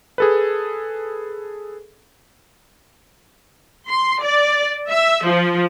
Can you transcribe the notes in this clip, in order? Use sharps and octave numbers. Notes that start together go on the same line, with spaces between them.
G#4 A4 B4
C6
D5
E5
F3